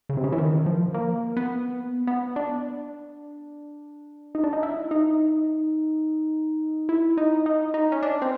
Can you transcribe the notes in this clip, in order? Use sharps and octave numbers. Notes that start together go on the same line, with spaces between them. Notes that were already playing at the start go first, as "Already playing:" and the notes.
C#3
C3
C#3
E3
D#3
F3
A#3
B3
B3
D4
D#4
D4
D#4
E4
D#4
E4
D#4
D#4
D#4
C#4
D4
C4